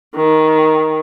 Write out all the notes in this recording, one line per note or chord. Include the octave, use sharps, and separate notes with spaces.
D#3